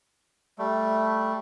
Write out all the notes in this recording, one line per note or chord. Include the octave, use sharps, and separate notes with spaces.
G3 A3